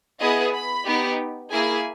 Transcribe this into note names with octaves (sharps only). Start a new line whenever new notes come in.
B3 E4 G#4 D#5
B5
B3 D#4 G4
A#3 E4 G#4 G#5